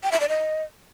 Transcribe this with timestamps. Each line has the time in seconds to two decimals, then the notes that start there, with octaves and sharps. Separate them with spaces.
0.03 G5
0.12 E5
0.20 D5
0.29 D#5